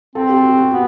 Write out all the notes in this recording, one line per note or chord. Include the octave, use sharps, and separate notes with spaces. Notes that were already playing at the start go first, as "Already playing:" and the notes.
C4 A4
G4
F#4
F#4
B3 F#4